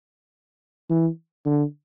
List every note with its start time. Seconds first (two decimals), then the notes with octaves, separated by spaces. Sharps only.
0.90 E3
1.46 D3